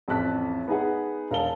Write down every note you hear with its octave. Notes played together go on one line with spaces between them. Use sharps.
A1 F2 A5 F#6 B6
B3 D#4 G#4 F#5
E1 A#4 F5 A5 G7